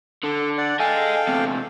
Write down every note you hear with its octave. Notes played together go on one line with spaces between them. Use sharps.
D3 A4
D5 F#5
A4 D#5 F5 G5 G#5
E2 C3